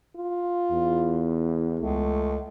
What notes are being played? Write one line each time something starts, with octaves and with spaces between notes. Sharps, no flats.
F4
E2
C#2 A3